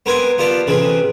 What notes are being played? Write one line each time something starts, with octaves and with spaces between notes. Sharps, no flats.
B3 C4 A#4 B4 G#5
B3 F4 G4 D5 A5
A1 C3 G#4 B4